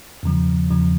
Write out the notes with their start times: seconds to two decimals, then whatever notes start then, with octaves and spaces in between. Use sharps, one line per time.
0.23 E2 C#3 F3
0.71 E2 C#3 F3